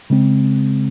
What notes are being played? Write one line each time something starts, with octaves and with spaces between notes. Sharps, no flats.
C#3 G#3 C4